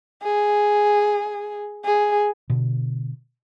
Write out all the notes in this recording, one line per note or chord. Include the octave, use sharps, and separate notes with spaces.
G#4
G#4
B2 D3